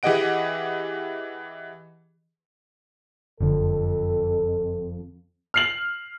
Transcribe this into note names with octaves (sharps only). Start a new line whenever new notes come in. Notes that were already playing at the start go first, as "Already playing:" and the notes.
E3 G4 G#4 D#5 F#5 D7
F#1 F2 D3 A4
F6 C7 F#7